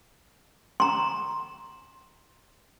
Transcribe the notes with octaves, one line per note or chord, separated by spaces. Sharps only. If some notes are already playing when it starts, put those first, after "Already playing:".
A#5 C6